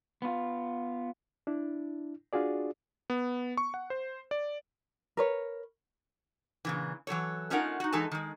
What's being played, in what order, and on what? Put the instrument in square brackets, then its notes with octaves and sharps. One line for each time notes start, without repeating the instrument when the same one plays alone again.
[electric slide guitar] B3 F4
[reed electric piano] D4 E4
D4 F4 F#4 G#4 D5
[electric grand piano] B3
C#6
F#5
C5
D5
[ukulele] A#4 B4 C#5
[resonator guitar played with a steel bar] A#2 C#3 E3
E3 F#3 A4 C#5
A3 C#4 D#4 F4 A#4 F#5
D#4 F#4
E3 G#3 D#4 A4 G#5 A5
D#3 G#3